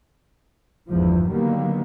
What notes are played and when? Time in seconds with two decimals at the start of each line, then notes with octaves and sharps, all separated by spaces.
0.88 G1 E2 G#2 D3 F3
1.30 D3 D#3 F#3 G3 A#3 B3